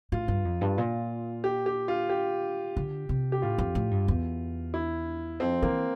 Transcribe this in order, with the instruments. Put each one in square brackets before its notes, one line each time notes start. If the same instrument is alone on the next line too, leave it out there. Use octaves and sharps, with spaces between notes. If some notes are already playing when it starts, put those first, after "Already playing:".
[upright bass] A2 [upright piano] F4
[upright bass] G2
F2
G2
A#2
[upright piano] G4
G4
F4
G4
[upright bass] D3
C3
[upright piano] G4
[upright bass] A2 [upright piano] F4
[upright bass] F2
A2
G2
E2
[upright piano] E4
[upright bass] F2 [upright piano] C4
[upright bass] E3 [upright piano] A#3